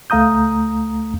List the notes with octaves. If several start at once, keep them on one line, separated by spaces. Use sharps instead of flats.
C#2 A3 F5 A#5 D#6 G6